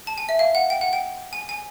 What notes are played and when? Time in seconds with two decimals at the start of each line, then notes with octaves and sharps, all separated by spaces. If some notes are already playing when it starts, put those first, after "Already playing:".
0.07 A5
0.18 G#5
0.29 E5
0.39 F5
0.55 F#5
0.70 G5
0.81 F#5
0.93 G5
1.33 G#5
1.49 G#5